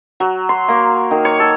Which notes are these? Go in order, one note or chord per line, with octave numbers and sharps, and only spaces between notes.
F#3
C6
A#3
D#3
C#5
A4